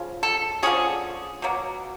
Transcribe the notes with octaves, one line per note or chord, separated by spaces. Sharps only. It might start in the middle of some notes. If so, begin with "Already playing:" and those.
Already playing: C#3 F3
A4
D3 F3 A3 C#4 G#4
B2 F#3 A#3